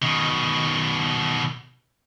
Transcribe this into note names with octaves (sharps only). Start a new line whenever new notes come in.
B2 D#3